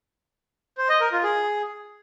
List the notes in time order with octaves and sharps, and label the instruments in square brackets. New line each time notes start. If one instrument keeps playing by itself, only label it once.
[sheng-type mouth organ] C5
D#5
A#4
F4
G#4